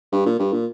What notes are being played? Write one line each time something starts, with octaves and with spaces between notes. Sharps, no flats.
G2
A#2
G2
A#2